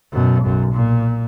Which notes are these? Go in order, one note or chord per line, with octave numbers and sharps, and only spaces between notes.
F#2 B2
B1 F#2
A#2